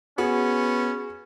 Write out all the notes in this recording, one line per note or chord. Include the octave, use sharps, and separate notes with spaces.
B3 C#4 F#4 G#4